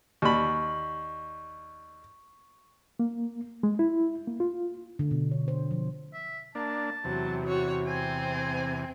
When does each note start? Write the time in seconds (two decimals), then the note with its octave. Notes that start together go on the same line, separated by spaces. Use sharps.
0.22 D#2 D5 B5 C#6
3.00 A#3
3.63 G#3
3.79 E4
4.27 A#3
4.40 F4
4.99 D3
5.11 B2
5.31 C#5
5.48 C5
5.71 F3
6.14 E5
6.55 A#3 D4 A5
7.05 E2 C3 F#3
7.46 F#4 C#5
7.86 C4 G#5